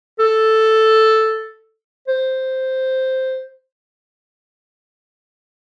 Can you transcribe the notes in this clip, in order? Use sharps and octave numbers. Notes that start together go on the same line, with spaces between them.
A4
C5